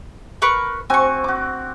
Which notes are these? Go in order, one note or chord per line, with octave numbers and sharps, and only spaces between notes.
A#4 B4 C#6
C4 F#4 G#5 C#6
F#4 D6